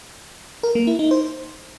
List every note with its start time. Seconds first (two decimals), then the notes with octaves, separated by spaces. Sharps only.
0.63 A#4
0.75 A#3
0.87 E4
0.99 D#4
1.11 C5